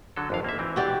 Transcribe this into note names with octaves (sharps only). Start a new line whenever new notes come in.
D3 F#3 A4
G#1 F2 F5
A#3 E5
E3 C4
F#4 G4 D5